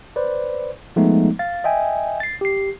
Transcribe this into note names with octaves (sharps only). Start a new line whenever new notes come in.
B4 C5 D5
F3 G#3 A3 B3 D#4
F5 A6
D#5 E5 G5 G#5
A6 C7
G4 C7